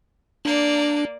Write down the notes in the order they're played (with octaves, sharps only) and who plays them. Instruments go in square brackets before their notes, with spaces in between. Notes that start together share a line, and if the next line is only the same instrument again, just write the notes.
[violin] A#3 D5 [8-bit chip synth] D4